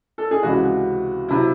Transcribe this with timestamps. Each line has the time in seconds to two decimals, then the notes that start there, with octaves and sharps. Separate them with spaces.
0.18 A4
0.31 G#4
0.43 C#2 C3 E3 F#4
1.29 C3 F#3 E4